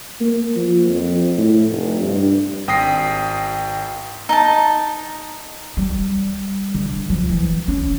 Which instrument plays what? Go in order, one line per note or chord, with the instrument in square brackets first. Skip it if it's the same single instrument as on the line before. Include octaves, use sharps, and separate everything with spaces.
[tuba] A#3
F3
F2
A2
F1
G2
[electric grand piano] G#1 G5 D#6 A#6 C7
[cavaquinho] D#4 A5
[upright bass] G3
D3
F3
E3
C#4